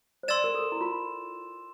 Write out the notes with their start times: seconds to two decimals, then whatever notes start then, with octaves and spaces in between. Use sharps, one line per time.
0.23 C5
0.28 D5 C6 E6 A6 E7
0.44 A#4
0.55 A4
0.72 E4
0.81 F4